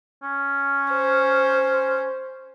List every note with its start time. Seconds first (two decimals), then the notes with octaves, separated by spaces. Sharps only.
0.23 C#4
0.93 C5